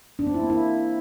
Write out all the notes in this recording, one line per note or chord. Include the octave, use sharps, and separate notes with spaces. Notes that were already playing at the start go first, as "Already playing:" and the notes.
D4
C4
E4
A#3
E4